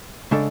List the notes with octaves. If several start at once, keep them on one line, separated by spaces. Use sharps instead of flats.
C#3 G#3 D4 A4